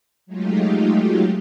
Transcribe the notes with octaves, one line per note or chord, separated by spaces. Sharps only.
F#3 G#3 A3 D#4 F4 G4